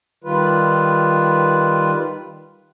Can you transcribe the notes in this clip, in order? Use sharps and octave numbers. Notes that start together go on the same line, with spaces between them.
D#3 G3 F4 B4